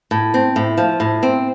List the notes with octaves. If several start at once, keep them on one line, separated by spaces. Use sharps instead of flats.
A2
C4
A2
F3
A2
C4